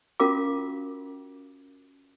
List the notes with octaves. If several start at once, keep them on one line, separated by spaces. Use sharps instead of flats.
C#4 F4 F#4 A#4 F5 D6